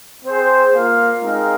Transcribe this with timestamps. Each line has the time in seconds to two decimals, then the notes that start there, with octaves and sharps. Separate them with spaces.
0.25 C4 G#4 C5
0.73 A#3 F4 A#4 F5
1.21 G#3 C4 D#4 A#4 F5